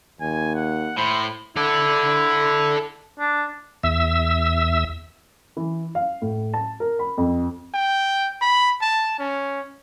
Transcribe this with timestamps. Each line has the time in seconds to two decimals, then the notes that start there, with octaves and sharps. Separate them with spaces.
0.21 D#2 G#5
0.55 F#5
0.97 A2 C5 B5
1.57 E4 A4 D5
3.20 D4
3.83 E2 E5 E6
5.57 E3
5.95 F5
6.22 A2
6.54 A5
6.80 A#4
6.99 B5
7.18 F2
7.74 G5
8.41 B5
8.82 A5
9.19 C#4